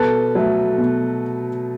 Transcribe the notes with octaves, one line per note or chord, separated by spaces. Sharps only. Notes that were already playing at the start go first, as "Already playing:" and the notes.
Already playing: B2 A4 B4
F#3 A3
B2